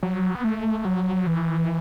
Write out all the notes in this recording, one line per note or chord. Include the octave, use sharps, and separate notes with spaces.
F#3
B3
A3
F#3
E3